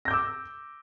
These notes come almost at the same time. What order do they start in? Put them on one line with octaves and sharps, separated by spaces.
A#6 G6 D6 E6